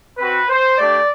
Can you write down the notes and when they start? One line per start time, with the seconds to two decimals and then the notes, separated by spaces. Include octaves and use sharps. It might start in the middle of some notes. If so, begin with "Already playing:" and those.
0.18 C4 F#4 B4
0.49 C5
0.78 A3 D4 G4 D5